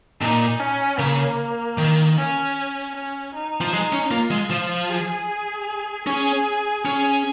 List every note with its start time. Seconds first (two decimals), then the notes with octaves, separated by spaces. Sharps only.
0.21 A#2 D#4
0.60 C#4
0.99 C#3 A#3
1.78 D#3
2.17 C#4
2.95 C#4
3.34 D#4
3.61 F3
3.73 G#3 D#4
3.93 C#4
4.11 A#3 F4
4.31 G#3
4.50 F3 F4
4.90 G#4
6.06 C#4 G#4
6.85 C#4 G#4